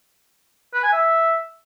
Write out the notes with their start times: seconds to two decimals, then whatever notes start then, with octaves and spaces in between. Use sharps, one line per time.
0.74 B4
0.83 G#5
0.93 E5